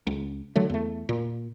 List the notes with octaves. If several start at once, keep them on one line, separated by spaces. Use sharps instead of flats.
C#2
D3 F#3 A3
E2 A3
A#2